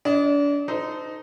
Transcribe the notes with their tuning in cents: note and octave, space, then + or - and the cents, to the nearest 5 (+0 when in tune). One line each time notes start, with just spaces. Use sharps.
D4 -35 D#5 +0
D#4 +0 A4 +0 C5 -30